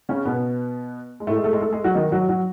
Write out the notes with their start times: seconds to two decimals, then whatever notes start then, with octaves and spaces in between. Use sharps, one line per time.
0.09 C#3 C#4
0.25 B2 B3
1.20 G#3
1.27 A2 A3
1.36 G#3 G#4
1.44 A3 A4
1.53 G#3 G#4
1.61 A3 A4
1.73 G#3 G#4
1.84 F#3 F#4
1.95 D#3 D#4
2.12 F#3 F#4
2.29 F#3 F#4